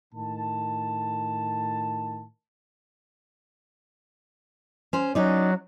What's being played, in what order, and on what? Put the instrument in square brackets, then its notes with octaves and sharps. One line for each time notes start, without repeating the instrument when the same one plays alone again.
[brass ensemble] A2 D#3 A5
[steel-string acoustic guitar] C#4 C5
[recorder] F#3 [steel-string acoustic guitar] C#4 D#4 D5